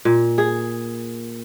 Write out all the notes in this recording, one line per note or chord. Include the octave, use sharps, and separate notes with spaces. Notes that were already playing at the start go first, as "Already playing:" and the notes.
A#2
G#4